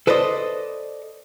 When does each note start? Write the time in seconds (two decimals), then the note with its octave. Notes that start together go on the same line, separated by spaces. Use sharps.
0.07 A4 B4 C5 D5 D#5